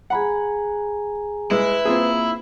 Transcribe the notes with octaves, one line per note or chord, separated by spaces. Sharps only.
G#4 F#5 G#5 A#5 B5
G#3 E4 B4
A#3 C4 F4 G#4